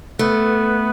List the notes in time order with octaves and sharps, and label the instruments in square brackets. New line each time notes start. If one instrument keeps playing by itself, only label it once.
[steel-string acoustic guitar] A3 [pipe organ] B3 B4